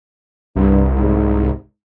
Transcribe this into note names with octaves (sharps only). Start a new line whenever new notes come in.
C2 G2
G#2